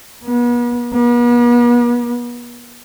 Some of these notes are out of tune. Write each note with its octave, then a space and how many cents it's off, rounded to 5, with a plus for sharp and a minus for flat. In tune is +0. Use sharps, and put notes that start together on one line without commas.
B3 -40
B3 -45